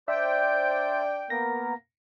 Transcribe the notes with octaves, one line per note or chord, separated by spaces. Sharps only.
D4 C5 D5 E5 G5
A#3 B3 A#4 A#6